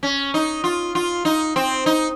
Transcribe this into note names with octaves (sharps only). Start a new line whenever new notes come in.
C#4
D#4
F4
F4
D#4
C4
D#4